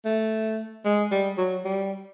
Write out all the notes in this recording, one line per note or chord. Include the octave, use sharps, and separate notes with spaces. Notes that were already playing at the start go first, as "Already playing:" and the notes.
A3
G#3
G3
F#3
G3